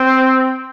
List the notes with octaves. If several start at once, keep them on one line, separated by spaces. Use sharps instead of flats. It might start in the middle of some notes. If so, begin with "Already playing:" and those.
Already playing: C4